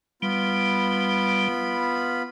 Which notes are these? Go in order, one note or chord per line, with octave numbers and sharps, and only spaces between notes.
G3 B3 F4 B5